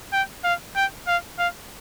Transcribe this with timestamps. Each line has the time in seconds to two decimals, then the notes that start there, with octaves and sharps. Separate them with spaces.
0.13 G5
0.44 F5
0.76 G5
1.07 F5
1.38 F5